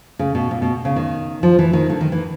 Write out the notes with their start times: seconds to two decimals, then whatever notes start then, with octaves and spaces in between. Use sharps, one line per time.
0.19 C#3
0.35 B2
0.51 A#2
0.62 B2
0.85 C#3
0.96 D#3
1.43 F3
1.59 E3
1.73 D#3
1.90 D3
2.01 D#3
2.12 E3